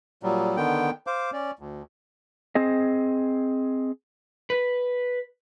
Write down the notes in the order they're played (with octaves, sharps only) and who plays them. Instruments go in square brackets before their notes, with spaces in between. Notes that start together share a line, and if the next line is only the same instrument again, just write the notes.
[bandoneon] A#2 F#3 G3
D3 D#3 B3 G5
C5 F5 D6
C#4 D5
D2
[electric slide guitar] C4 G#4 D#5
B4